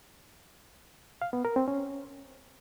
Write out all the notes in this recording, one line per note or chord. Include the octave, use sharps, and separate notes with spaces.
F5
B3
A#4
C4
C#4